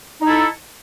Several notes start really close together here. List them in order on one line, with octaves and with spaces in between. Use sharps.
D#4 E4 A4